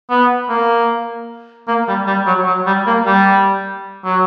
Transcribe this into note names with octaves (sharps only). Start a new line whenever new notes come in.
B3
A#3
A#3
G3
G3
F#3
F#3
G3
A#3
G3
F#3